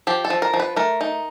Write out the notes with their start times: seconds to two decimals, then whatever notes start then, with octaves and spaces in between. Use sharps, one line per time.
0.07 F3 G4
0.25 A4
0.30 F3
0.42 A#4
0.54 F3
0.60 B4
0.76 A3 A#4
1.01 D#4